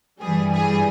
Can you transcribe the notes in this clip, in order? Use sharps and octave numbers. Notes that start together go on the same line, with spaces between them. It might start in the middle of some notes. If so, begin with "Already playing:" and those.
G2 E3 G3 G#4
G#4